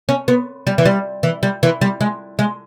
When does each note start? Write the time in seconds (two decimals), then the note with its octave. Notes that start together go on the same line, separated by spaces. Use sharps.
0.09 C#4
0.28 B3
0.67 G3
0.78 E3
0.86 G3
1.23 E3
1.43 G3
1.63 E3
1.81 G3
2.01 G#3
2.39 G#3